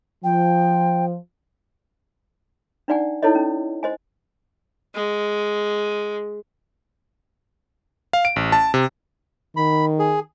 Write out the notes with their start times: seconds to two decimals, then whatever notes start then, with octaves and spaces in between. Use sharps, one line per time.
0.24 F3 G5
2.88 D4 D#4 D5 F#5 G#5
3.23 D#4 E4 A4 C#5 D#5
3.35 C#4
3.83 C5 D#5 G#5
4.94 G#3
8.13 F5
8.25 D7
8.36 A1
8.52 A5
8.74 C3
9.57 D#3 B5
9.99 G#4